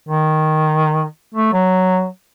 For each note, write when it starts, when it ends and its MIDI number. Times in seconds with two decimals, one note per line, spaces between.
0.09 1.05 51
1.34 1.53 57
1.53 2.06 54